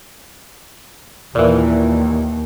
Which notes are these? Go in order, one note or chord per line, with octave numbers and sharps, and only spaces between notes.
D#2 A#2 E3